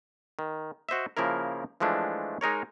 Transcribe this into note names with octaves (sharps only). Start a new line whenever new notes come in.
D#3
F#4 C5 D#5 E5
C#3 F3 A#3 E4 A#4
E3 F3 G#3 A3 D4
G#3 D#4 A#4 C#5